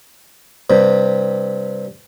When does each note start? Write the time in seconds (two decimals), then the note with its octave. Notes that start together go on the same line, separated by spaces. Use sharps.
0.70 G2 C3